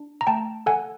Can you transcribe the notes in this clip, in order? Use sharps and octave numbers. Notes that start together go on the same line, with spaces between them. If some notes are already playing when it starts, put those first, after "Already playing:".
Already playing: D4
A#5
A3 G5 A5
A4 F#5 G#5